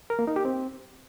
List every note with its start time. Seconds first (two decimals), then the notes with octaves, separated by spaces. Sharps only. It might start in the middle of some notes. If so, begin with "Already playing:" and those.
0.10 A#4
0.19 A#3
0.27 D#4
0.36 G4
0.45 C4